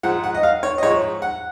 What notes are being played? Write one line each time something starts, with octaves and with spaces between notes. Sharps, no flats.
G#2 F3 F#5
F#5
D#5
F5
C#5
D#5
G#2 F3 C#5
F#5